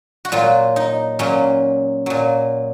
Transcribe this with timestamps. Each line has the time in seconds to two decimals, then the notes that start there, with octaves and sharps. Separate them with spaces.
0.25 F#4
0.32 A#2 F#3 F4
0.76 D#4
1.19 A#2 F#3 C#4
2.06 A#2 F#3